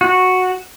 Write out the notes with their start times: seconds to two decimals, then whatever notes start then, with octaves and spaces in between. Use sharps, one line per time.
0.01 F#4